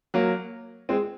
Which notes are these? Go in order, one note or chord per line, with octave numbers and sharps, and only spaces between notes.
F#3 A#3
G#3 C4